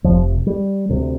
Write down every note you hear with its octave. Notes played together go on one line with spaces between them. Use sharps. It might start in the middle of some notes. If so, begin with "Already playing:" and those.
F1 F2 C3 F3
G3
D2 C3